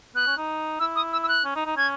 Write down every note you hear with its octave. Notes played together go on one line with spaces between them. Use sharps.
B3 F#6
C#4
D#4
E4 E6
D#6
E6
E6
F#6
C#4
D#4
D#4
C#4 G#6